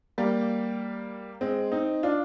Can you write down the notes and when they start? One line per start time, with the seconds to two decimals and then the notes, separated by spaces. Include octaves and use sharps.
0.18 G3 A#3
1.41 G#3 C4
1.72 C4 D#4
2.03 D4 F4